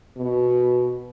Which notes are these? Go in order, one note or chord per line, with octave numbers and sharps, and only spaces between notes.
B2